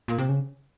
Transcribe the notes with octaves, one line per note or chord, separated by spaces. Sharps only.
A#2
C3
C#3